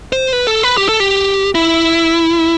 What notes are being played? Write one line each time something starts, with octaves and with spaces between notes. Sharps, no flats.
C5
B4
A4
B4
G4
A4
G4
E4